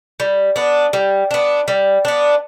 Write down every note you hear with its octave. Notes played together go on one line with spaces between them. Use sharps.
G3
B3 D4
G3
B3 D4
G3
B3 D4